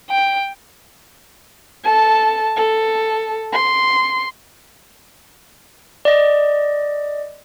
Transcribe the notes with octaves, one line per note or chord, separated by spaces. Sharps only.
G5
A4 A5
A4
C6
D5 D#5